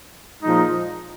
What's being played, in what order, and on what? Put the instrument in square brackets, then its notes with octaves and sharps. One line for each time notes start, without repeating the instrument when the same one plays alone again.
[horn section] A#2 F3 G#3 D#4